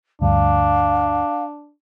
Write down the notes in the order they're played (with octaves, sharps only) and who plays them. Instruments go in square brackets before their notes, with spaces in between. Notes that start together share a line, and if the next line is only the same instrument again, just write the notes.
[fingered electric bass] D2 G2 [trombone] D4 [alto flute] F5